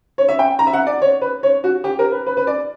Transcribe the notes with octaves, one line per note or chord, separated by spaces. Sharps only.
C#5
E5
G5
A#5
E5
F#5
D5
C#5
B4
C#5
F#4
G4
A#4
B4
B4
B4
D5